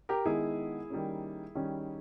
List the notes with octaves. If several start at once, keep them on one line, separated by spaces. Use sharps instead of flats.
G4 A#4
D#3 G#3 B3 E4 G#4
D#3 G3 A#3 C#4
D#3 G3 C#4